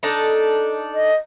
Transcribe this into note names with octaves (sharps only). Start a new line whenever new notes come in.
D4 D#4 A4
D#5